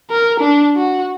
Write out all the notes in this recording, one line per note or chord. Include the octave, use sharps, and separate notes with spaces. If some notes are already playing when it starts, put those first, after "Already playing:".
A#4
D4
F#4